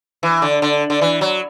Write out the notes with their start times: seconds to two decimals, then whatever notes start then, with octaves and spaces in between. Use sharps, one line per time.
0.23 E3
0.42 D3
0.62 D3
0.90 D3
1.01 E3
1.21 F#3